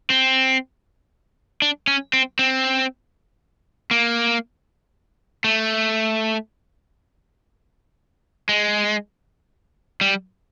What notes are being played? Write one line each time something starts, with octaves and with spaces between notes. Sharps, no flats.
C4
D4
C#4
C4
C4
A#3
A3
G#3
G3